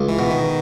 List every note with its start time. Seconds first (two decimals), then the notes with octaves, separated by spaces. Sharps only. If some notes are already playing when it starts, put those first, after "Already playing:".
Already playing: C#2
0.08 E3
0.19 B2
0.30 D#3